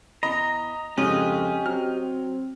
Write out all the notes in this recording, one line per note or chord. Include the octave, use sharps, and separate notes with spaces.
E2 D#5 A#5 B5
F2 G#2 C#3 G#3 C#4 G4 D#5
F#3 C4 F6